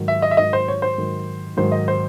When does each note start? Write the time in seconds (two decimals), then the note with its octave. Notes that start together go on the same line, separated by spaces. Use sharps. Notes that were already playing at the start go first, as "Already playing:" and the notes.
Already playing: G#2 D#3 F#3
0.08 E5
0.22 D#5
0.31 E5
0.37 G#2 D#3 F#3 D#5
0.53 C5
0.68 C#5
0.82 C5
0.98 G#2 D#3 F#3
1.57 G#2 D#3 F#3 C5
1.72 D#5
1.88 C5